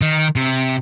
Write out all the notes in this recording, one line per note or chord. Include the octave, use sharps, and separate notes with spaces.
D#3
C3